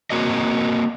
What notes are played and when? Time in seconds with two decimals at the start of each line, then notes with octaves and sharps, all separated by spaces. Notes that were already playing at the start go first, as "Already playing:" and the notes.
0.10 A#3 C4 F#4 A#4 C#5 D#5